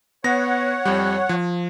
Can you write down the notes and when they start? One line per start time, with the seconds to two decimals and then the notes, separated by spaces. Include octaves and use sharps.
0.24 B3 C#5 F#5 A#6
0.85 F2 G3
1.29 F3